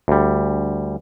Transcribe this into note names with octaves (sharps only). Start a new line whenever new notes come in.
D2 G3